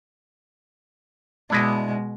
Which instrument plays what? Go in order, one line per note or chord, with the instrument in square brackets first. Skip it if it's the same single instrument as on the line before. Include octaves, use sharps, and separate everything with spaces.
[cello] B2 G#3 [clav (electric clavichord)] D4 E4 D#5